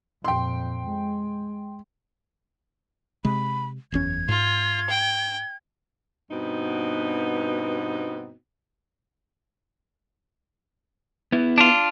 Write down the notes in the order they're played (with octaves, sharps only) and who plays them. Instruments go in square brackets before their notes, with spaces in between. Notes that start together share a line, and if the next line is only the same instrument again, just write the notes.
[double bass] F2 A#2 [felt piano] G5 C6
[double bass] G#3
[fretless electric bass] C3 G#3 [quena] B5
[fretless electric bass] F#1 E2 C#4 [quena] G#6
[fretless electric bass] G#2 [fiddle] F4
[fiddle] G5
[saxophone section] G2 B2 B3 C4 D#4 F#4
[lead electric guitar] B3 E4
[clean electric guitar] D4 F4